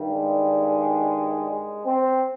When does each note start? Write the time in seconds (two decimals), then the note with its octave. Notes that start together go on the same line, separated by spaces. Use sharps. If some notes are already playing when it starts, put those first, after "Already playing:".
Already playing: G2 D#3 G3
0.08 G#3
1.50 G#3
1.85 C4